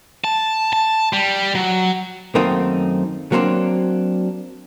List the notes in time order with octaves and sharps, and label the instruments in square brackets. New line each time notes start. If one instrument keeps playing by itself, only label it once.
[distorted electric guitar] A5
A5
G3
F#3
[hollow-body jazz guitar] F#2 D#3 A3 A#3 C4 D#4
F#3 A#3 C4 D4